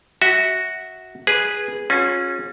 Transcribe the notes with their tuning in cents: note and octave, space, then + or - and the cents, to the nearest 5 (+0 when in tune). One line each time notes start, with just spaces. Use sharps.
F#4 +0 E5 -25
G#4 -5 B4 -10
C#4 -15 F4 +45 G#4 +0